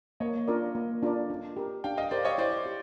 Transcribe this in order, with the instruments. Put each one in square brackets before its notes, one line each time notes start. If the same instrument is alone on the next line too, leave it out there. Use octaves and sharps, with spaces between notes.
[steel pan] A#3 [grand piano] C#5 D#5
[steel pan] D4 F4 A#4 D5
A#3
D4 F4 A#4 D5
D4
G4 A#4
[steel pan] D4 [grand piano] F5 G5
[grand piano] D#5 F5
[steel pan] G4 A#4 [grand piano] C5 D5
[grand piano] C#5 D#5
[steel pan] E4 [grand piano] C5 D5
[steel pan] G4